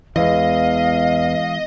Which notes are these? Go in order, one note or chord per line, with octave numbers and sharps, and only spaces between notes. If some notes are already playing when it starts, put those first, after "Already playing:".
E2 E3 G#3 D#5 F5